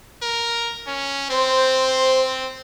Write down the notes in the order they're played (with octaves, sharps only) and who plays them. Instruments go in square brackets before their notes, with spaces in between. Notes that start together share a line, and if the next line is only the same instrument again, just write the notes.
[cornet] A#4
C#4
[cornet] C4 [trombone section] C5